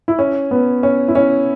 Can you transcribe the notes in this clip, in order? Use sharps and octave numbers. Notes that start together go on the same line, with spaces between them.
E4
C#4
B3
C#4
E4
C#4